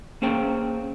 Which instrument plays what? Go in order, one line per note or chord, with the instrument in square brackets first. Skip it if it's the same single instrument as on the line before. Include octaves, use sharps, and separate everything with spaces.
[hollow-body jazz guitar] A#3 C#4 G#4 C5 G5